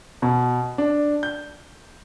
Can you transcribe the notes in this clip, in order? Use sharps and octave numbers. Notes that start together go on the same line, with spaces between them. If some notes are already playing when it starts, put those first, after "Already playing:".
B2
D4
G6